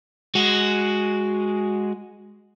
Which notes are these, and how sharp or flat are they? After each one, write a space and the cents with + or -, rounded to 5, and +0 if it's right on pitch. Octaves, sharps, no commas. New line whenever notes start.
G#3 +0 F#4 +0